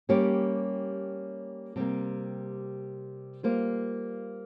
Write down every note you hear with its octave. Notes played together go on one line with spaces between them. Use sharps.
G3 A#3 C#4 G4 C#5
C3 G3 A#3
G3 A#3 F4 C5